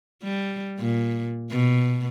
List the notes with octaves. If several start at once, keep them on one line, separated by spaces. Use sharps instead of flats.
G3
A#2
B2